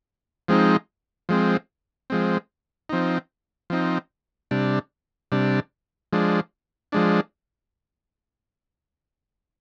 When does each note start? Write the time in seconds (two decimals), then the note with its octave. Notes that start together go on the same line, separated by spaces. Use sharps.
0.48 F3 G#3 C4 D#4
1.29 F3 G#3 C4
2.10 F3 G#3 C4
2.89 F3 C4 D#4
3.70 F3 C4 D#4
4.51 C3 G3 D4
5.32 C3 G3 D4
6.13 F3 G#3 D4
6.92 F3 G#3 D4